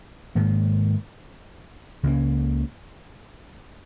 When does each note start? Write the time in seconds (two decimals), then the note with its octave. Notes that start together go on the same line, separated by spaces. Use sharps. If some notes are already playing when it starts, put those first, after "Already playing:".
0.35 G#2 D#3 A#3
2.03 C#2 C#3 A#3 C#4